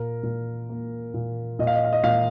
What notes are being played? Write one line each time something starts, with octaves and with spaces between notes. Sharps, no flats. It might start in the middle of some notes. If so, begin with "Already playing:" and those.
Already playing: A#2 A#4
A#2
A#3
A#2
A#2 D#5
F5
D#5
F5
D#5
A#2 F5